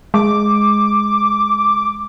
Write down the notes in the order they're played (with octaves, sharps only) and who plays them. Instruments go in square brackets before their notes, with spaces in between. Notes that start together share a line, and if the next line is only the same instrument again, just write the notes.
[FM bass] G#3 [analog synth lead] D6